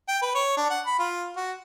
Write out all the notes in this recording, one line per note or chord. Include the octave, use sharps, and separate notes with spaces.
G5
B4
C#5
D4
F#5
B5
F4
F#4